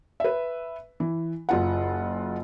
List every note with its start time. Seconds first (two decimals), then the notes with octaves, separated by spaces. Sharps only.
0.20 B4 E5
1.00 E3
1.49 F#1 F4 F#5